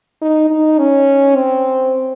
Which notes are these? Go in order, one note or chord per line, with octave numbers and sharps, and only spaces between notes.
D#4
D#4
C#4
C4